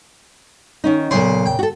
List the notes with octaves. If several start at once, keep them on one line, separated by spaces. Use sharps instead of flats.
D#3 C#4 D#4
B1 A#2 C#3 C5 C6
G5
F#4 A4